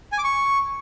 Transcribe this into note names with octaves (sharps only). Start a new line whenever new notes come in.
G#5
D6
C#6